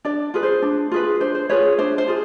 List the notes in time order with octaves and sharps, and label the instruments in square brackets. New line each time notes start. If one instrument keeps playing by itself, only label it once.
[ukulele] D4 D5
F4 G#4 B4
C5
D4
F4 G#4 B4
D4 C5
C5
F4 G#4 B4 C#5
D4 C5
C5
F4 G#4